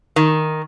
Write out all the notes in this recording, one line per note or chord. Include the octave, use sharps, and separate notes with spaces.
D#3